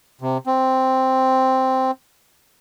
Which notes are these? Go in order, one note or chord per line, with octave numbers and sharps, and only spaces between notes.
C3
C4